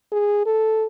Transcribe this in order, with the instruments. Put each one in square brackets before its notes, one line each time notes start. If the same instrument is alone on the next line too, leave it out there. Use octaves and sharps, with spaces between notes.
[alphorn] G#4
A4